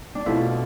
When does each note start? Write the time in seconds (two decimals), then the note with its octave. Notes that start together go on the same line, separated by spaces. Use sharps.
0.15 D4
0.26 B2 A3 C4 E4 F4